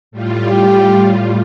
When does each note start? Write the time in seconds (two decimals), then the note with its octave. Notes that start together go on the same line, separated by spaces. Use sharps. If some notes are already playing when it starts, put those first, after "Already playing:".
0.11 A2 G3 F4
0.50 G4